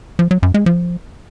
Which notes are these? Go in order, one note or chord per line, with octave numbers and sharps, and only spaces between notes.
F3
F#3
F#2
G#3
F3